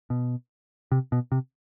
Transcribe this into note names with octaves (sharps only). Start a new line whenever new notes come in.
B2
C3
B2
C3